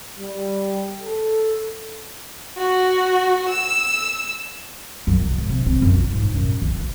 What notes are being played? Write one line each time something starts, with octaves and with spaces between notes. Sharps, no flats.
G3
A4
F#4
E6
F#2
C2
G#2
C3
C4
F#2
F4
G#2
F#2
D2
D2